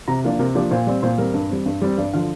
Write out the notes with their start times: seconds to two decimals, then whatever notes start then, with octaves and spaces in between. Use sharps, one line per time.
0.08 C3 A#5
0.24 F3 A#3 D4
0.39 C3 A#4
0.55 F3 A#3 D4 G4
0.71 A#2 C5
0.87 G3 C4 D5
1.02 A#2 C5
1.18 G3 C4 A#4
1.34 G2
1.49 G3 C4
1.66 G2
1.82 G3 C4
1.98 G2 D5
2.13 D3 F3 F5